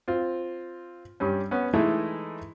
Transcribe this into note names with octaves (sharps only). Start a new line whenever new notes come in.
C4 F4
G2 G3 C#4
B3 C#4
E3 G#3 A3 D#4 E4